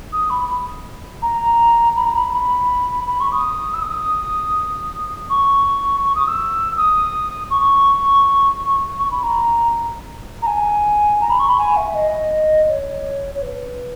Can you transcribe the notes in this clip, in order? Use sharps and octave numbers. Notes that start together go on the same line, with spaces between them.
D#6
B5
A#5
B5
A#5
B5
B5
B5
C#6
D#6
E6
D#6
C#6
C#6
D#6
E6
D#6
C#6
C#6
B5
A#5
A#5
G#5
A#5
B5
C#6
B5
G#5
E5
D#5
C#5
C#5
B4